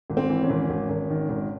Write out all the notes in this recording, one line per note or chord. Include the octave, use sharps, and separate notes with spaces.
G#1
C4
E3
C#4
G#1
G#1
G#1
D#3
G#1